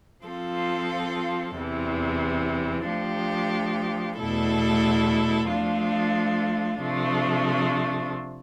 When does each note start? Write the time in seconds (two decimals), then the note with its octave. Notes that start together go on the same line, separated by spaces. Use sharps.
0.25 F3 C4 F4 A4
1.57 E2 C3 E3
2.87 F3 A3 D4 G4
4.20 E2 B2 A3 E4 A4
5.51 F3 A3 D4 F4
6.82 C3 F3 A3 D4